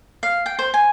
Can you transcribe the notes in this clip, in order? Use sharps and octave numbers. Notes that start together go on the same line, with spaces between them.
F5
G5
C5
G#5